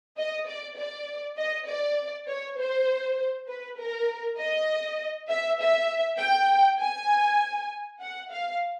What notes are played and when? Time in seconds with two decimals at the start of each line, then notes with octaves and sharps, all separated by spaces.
0.17 D#5
0.46 D5
0.77 D5
1.37 D#5
1.67 D5
2.27 C#5
2.58 C5
3.47 B4
3.78 A#4
4.39 D#5
5.29 E5
5.59 E5
6.19 G5
6.79 G#5
8.00 F#5
8.31 F5